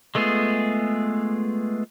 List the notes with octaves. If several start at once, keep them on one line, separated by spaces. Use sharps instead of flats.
G#3 A3 B3 F4 G#4